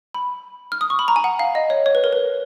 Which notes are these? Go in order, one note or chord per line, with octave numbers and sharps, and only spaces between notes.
B5
F6
D#6
C#6
B5
A#5
G#5
F#5
F5
D#5
C#5
C#5
B4
A#4
B4